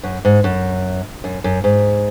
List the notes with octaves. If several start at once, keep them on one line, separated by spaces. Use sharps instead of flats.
F#2
G#2
F#2
F#2
F#2
G#2